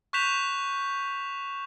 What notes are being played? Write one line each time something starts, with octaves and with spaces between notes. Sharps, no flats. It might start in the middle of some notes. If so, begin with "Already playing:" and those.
C#6 F#6 G6 B6 E7 F7